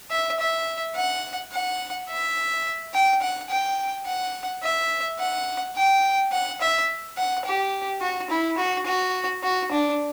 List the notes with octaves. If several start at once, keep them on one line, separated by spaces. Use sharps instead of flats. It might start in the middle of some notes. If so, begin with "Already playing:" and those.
E5
E5
F#5
F#5
E5
G5
F#5
G5
F#5
E5
F#5
G5
F#5
E5
F#5
G4
F#4
E4
F#4
F#4
F#4
D4